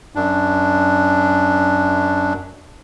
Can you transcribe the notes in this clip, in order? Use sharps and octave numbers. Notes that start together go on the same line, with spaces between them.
F#2 D4